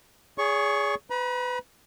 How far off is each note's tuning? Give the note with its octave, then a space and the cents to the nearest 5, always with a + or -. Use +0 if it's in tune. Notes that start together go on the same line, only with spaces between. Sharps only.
G#4 +0 C#5 +45 C#6 +0
B4 +25 B5 -45